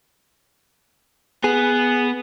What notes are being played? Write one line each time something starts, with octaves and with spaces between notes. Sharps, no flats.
B3 G#4